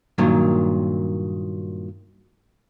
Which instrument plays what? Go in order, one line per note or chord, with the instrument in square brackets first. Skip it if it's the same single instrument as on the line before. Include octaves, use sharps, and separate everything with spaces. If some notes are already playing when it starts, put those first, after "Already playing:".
[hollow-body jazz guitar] G2 A#2 D#3 F#3